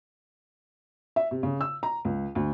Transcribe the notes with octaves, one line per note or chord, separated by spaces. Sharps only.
E5
C3
C#3
E6
A#5
C#2
D2